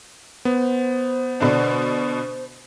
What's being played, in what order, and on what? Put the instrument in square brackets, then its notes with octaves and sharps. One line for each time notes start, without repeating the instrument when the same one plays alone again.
[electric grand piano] B3 [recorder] C5
[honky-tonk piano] B2 D3 D4